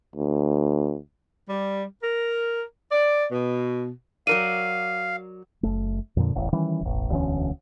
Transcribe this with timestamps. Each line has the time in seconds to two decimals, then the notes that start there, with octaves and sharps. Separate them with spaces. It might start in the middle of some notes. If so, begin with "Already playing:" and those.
0.16 D2
1.49 G3
2.03 A#4
2.92 D5
3.31 B2
4.27 F#3 A#4 D5 F5 D#7
5.63 F#1 A3
6.17 F2 A#2 D3
6.35 E1 A1
6.53 D#3 E3 G3 C#4
6.81 E1 A1
7.10 E1 D2 E3 C#4